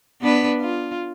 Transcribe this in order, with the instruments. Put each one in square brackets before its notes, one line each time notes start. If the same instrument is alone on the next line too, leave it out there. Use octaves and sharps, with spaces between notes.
[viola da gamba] B3 D4 B4
F4